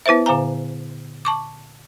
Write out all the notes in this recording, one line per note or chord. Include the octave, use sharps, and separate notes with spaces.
B3 E4 B4 C5 E5
A#2 D3 C5 F5 G#5 A#5
A5 C#6 D6